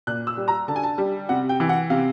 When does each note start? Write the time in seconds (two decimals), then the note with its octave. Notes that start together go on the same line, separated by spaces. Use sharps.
0.07 A#2 F#6
0.27 E6
0.37 G3
0.48 A#5
0.68 D3 A5
0.76 G#5
0.83 A5
0.98 G3
1.29 C3 F#5
1.49 G5
1.60 E3
1.69 F#5
1.90 C3 F5